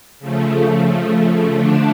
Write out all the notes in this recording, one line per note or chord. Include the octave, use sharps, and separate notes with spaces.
C#3 F3 A3
D3 F3 A3 D4